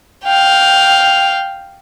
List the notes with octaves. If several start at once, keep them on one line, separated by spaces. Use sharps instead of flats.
F5 G5